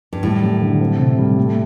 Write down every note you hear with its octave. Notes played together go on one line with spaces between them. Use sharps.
G2
A2 G3
F#2
D3
C4
C3
G3
A3